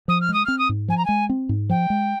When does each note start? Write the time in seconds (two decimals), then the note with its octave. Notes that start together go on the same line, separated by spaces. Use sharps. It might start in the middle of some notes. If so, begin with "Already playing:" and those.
0.08 F3 D#6
0.21 F6
0.29 G#3 D#6
0.45 C4 F6
0.58 D#6
0.69 G#2
0.88 F3 G#5
0.97 A#5
1.05 G#3 G#5
1.29 C4
1.49 G#2
1.70 F3 G5
1.90 G#3